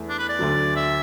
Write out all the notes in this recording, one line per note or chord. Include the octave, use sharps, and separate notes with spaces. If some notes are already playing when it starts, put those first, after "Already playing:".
Already playing: E2 E3 A3 E4
D4
B4
D5
D2 D3 F#3
E5